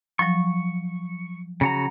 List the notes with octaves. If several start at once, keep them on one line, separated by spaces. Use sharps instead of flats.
F3 F#3 C#6
C#3 F#4 A#5